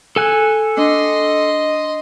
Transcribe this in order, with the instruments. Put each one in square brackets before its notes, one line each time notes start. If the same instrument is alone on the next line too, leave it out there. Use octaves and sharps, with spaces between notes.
[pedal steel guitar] A4 G#5 F#6
[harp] D4 [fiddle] D#5 C6